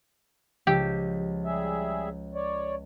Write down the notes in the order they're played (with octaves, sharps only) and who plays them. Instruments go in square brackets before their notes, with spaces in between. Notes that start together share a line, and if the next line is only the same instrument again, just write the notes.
[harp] C#2 F3 E6 [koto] G4
[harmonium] G3 G#4 E5
C#5 D5